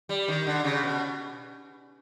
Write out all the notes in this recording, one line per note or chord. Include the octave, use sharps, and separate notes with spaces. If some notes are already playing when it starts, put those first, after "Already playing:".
G3
D#3
D3
C#3
B2